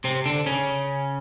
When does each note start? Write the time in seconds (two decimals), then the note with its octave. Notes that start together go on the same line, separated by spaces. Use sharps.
0.04 C3 C4
0.26 D3 D4
0.46 C#3 C#4